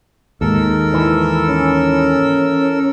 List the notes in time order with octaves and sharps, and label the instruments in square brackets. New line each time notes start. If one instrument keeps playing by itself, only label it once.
[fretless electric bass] D#2 G#2 [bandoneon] A4 A#4 E6
[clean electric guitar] E3
[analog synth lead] C#4